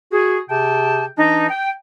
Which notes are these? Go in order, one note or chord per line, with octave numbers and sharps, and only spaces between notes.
F#4 G#4
C3 G#4 G5 A5
E3 D4 D#4
G5